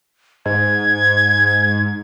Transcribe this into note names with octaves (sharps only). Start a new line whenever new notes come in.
G#2 G#6